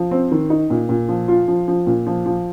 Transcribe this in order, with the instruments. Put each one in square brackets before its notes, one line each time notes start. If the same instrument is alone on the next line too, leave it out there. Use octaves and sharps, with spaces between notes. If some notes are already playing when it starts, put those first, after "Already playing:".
Already playing: [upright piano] F3
C4
D#3
D#4
A#2
A#2
F3
F4
F3
F3
A#2
F3
F3